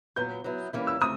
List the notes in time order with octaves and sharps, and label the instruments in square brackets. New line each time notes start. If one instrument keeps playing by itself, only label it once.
[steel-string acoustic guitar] A#2 F#3 B3 [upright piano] G6
[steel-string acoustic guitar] F#3 B3 E4
E3 G3 A#3 C#4 E4
[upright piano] E6
[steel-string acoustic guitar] A3 C4 [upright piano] D#6